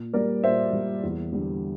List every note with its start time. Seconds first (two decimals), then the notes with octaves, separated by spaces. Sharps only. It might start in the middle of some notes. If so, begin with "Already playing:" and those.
Already playing: A#2
0.13 G3 A#3 A#4 D5
0.44 A#2 C5 E5
0.73 G3 A#3
1.03 E2
1.33 D3 G3